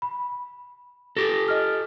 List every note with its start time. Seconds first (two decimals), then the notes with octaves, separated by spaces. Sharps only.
0.02 B5
1.17 G4 A4 A#6
1.48 D#5 F6